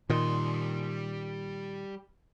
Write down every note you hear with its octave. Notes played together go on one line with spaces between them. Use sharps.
A#2 D#3 G3 C6